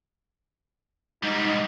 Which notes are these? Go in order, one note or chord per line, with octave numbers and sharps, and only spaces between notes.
G#2 G3 D#4